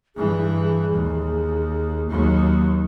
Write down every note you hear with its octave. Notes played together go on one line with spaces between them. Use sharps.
G2 E3 G#4
D#2
D#2 F#3